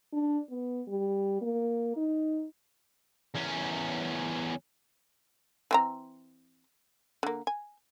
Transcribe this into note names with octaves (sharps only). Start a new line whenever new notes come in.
D4
B3
G3
A#3
D#4
E2 C#4
E3 C4 A#5
D3 A#3
G#5